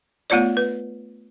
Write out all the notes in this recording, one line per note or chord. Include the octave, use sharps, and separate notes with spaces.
A3 B3 F4 C#5 D5
B4